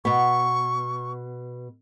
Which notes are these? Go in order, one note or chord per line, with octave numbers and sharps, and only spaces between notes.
B2 B3 C#6